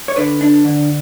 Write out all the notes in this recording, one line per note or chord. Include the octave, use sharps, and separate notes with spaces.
C#5
D3 B4 D5
D4
D3